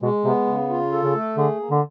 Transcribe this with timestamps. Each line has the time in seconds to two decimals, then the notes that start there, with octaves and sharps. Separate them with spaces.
0.02 B2 G#3
0.24 C3 B3
0.47 C#3
0.70 F4
0.92 A4
1.04 C#3
1.14 A3
1.37 D3 G#4
1.60 A#3
1.71 D3